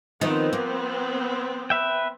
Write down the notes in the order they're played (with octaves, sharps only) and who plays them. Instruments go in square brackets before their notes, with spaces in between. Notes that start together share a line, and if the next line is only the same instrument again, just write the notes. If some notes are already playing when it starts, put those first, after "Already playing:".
[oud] D#3 F3 [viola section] B3 C4
[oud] A#3
[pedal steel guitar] B4 E5 G5